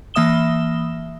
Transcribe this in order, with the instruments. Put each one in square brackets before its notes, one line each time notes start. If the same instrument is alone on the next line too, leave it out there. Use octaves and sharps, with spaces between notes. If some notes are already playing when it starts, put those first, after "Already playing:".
[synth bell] E3 A#3 E5 D#6 E7 G7